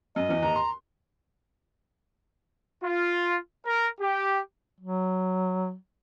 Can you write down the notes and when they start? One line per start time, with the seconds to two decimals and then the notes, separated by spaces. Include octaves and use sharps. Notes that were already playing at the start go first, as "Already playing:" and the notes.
0.16 F#2 D#5
0.29 E2 E3
0.43 D#2 A#5
0.56 C6
2.83 F4
3.66 A#4
4.01 G4
4.80 F#3